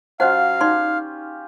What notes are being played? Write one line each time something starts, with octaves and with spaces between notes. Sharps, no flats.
F#3 C#4 F4 C5 D#5 F5 F#5
D#4 G4 D5 C6